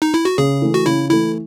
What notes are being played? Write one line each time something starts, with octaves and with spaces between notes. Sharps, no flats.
D#4
E4
F#4
C#3 G#4
E3 A3
F#4
C#3 E4
E3 A3 E4